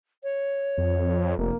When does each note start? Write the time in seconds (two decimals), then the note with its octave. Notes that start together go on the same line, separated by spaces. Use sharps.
0.23 C#5
0.78 F2
1.38 F1 A#3